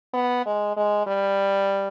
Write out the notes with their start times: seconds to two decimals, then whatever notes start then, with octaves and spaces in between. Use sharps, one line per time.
0.14 B3
0.46 G#3
0.77 G#3
1.07 G3